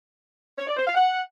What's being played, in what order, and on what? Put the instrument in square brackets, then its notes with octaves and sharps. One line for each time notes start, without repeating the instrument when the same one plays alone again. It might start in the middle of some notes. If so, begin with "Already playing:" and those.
[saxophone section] C#5
D5
C5
F5
F#5